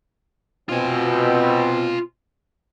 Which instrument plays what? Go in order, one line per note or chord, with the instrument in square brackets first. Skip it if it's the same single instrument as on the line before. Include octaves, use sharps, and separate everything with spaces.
[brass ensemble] B2 C4 [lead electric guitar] F4 G#5